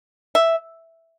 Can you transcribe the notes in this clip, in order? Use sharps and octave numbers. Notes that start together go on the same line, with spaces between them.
E5